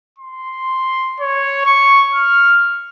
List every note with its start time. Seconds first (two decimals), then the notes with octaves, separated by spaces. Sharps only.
0.19 C6
1.21 C#5
1.66 C#6
2.15 F6